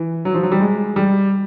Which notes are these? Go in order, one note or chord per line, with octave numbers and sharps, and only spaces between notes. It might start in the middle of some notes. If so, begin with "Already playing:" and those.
Already playing: E3
F#3
F3
F#3
G3
G#3
G3